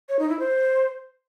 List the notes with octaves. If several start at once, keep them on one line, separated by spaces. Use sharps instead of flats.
C#5
D#4
E4
C5